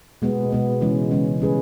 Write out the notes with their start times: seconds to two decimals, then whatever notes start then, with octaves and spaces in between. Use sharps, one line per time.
0.22 B2 G#3 B3
0.52 B2 G#3 B3
0.81 C#3 E3 G#3 C#4
1.11 C#3 E3 G#3 C#4
1.40 G3 C#4 G#4 B4